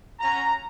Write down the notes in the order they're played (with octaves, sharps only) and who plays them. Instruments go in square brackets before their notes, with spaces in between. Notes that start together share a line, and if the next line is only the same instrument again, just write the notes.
[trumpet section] C#4 F#4 A#5